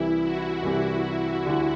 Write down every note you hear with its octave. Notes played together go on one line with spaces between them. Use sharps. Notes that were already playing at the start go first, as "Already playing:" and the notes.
Already playing: C2 C3 E3 G3 E4
F#4
C2 C3 E3 G3
D2 D3 G3